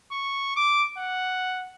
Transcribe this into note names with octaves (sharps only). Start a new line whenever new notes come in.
C#6
D6
F#5